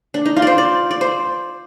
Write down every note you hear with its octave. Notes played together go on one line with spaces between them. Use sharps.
D4
D#4
F4
C5 D5
D5
D5
C5